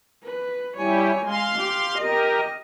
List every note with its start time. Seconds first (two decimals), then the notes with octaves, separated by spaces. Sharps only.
0.25 B4
0.77 G3 E4 G4 C#5 G#5
1.27 G#3 F5 C6
1.59 G4
1.99 G4 A#4 D#5